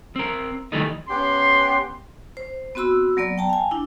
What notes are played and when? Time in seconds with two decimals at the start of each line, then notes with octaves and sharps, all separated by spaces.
0.16 C4 A#4
0.72 D#3 E3 G3 A3 D#4
1.08 B3 C#4 G4 C6
2.37 C5
2.75 B3 C4 F#4 B5 E6
3.17 F#3 A#3 B3 D5
3.38 G5 A5 A#5
3.50 F5 G#5
3.71 D4 E4